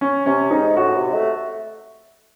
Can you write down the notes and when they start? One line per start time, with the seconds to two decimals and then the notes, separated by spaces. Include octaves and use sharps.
0.01 C#4
0.26 C3 C#4
0.51 G#2 D#4
0.76 A2 F#4
0.96 C3
1.14 A3